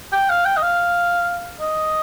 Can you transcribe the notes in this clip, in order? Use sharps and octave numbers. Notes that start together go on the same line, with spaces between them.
G5
F5
G5
D#5
F5
D#5